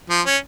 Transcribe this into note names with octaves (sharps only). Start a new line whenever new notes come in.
F3
C#4